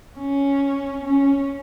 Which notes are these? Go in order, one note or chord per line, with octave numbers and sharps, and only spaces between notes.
C#4
C#4